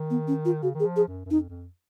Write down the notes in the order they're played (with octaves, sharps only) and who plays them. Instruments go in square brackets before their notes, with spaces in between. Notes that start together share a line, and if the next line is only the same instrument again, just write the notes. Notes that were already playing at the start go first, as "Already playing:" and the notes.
Already playing: [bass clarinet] D#3
[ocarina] B3
C#4
F4
[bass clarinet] C#3 [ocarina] F#4
[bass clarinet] D#3
[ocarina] G#4
[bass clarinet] F3
[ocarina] G#4
[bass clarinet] F#2
F#2
[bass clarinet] F2 [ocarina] D#4
[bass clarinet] F2